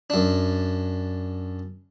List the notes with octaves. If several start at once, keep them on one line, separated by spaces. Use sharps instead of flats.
F#2 D4